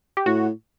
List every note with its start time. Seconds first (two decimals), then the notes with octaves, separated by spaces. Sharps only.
0.17 G4
0.26 A2 F#4